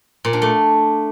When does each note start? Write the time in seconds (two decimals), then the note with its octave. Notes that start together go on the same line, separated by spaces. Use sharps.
0.25 A#2
0.33 D4
0.42 A3